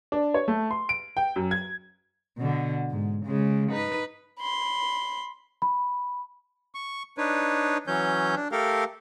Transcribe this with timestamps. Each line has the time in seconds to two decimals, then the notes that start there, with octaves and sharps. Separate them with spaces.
0.12 D4
0.34 C#5
0.48 A3
0.71 C6
0.89 D7
1.17 G5
1.36 F#2
1.51 G#6
2.38 B2 D3
2.91 G#2
3.26 C#3 G#3
3.70 D#4 B4
4.40 B5 C6
5.62 B5
6.75 C#6
7.18 D4 D#4 B4 C#5
7.87 E3 F#3 C#4 C#5 G6
8.36 D4
8.52 A3 G4 A4 A#4 F5